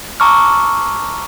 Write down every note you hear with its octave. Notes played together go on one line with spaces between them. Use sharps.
A5 A#5 C#6 D6 E6 F6